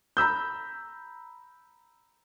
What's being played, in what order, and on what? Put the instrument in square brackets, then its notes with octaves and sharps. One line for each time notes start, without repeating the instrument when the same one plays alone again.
[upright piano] A#5 B5 E6 G6